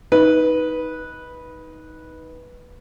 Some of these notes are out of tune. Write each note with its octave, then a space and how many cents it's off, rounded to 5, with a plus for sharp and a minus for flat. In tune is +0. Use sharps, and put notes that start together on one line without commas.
D#4 +15 B4 -10